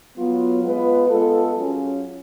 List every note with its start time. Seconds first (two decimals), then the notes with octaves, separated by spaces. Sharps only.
0.17 F#3 B3 F4
0.63 G#3 B3 F4 B4
1.09 G#3 B3 F4 A4
1.55 F#3 C#4 F4 G#4